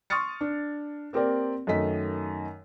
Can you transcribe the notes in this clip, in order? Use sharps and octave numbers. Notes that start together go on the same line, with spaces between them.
C6 C#6 D#6 F6 A6 C#7
D4
A#3 C4 G4 A#4 D5
F#2 D#3 A3 D#5 B6